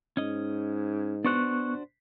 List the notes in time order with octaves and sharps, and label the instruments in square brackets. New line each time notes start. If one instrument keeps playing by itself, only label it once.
[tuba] G#2 [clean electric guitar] C#4 D#5
[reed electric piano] B3 C#6 F#6 [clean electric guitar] D4 F#4 C5